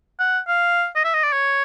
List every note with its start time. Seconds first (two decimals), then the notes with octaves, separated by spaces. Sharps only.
0.19 F#5
0.48 F5
0.96 D#5
1.05 E5
1.14 D#5
1.24 D5
1.33 C#5